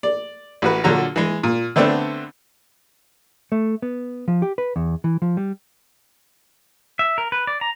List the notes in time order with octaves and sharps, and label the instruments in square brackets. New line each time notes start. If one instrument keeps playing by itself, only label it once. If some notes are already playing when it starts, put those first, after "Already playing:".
[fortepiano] D5
A1 F#4 B4
A#2 D3 F#3 F#4 A#5
E3 G#3
A#2
D3 A3 B3 C4 D4
[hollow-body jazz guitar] A3
B3
F3
G4
B4
E2
E3
F3
G3
[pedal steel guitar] E5
A#4
B4
D5
A#5